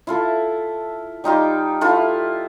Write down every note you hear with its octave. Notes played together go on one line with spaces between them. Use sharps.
E4 F4 A4
G3 D#4 F4 G4
E4 F4 A4